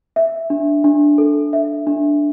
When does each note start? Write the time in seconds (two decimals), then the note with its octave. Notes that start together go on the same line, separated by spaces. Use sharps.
0.16 E5
0.50 D4
0.84 D4
1.18 A4
1.53 E5
1.87 D4